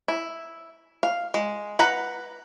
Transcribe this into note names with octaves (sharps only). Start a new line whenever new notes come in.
E4
F5
G#3
B4 F#5 A#5